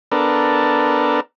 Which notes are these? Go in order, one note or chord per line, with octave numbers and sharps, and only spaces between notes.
B3 D4 A4 A#4